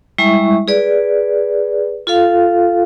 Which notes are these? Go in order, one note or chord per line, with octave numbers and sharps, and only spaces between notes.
G3 G#3 E4 E5 C#6
G#4 B4 D5
F4 A4 F5